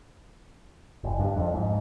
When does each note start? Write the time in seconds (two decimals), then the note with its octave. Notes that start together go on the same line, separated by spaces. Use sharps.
1.04 F#1
1.20 G2
1.36 F2
1.54 G#2